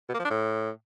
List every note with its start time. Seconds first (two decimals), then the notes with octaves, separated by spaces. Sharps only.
0.09 B2
0.14 A#3
0.20 F3
0.25 D4
0.30 A2